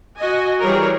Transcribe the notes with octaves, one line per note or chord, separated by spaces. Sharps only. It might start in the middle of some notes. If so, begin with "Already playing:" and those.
F#4 D#5 G#5
E3 G3 G#4 A#4 C#5